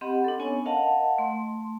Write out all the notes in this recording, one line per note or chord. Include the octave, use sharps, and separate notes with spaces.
C4 G4 D#5 F#5 B5
D4 A4
B3 C#4 C#5 G#5
A#4 D#5 F5 F#5 A5
A3 C6